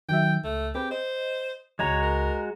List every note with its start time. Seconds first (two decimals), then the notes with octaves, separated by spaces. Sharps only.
0.09 D#3 F#3 E5 G5
0.44 C#2 A3
0.75 C4 G4 G#4 B4
0.91 C5 D#5
1.79 C#2 G#3 F#4 C#5 A#5 A6
2.03 A#4